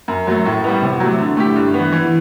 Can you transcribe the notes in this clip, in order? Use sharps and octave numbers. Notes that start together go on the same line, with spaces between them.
F#2
F#3 A3
A2
G3 B3
C3
F#3 A3
D3
A3 E4 G4
G2
B3
E3
E3